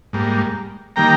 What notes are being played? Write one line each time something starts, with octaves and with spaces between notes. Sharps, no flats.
G#2 G3 A#3
D#3 G3 A#3 G5 A#5